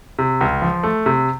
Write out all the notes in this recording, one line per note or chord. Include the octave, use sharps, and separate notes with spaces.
C3
C#2
F3
A3
C3